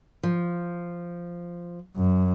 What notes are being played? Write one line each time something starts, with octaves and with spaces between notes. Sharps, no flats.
F3
F#2